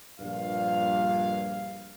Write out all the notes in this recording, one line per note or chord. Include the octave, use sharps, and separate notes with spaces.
A#1 G2 F5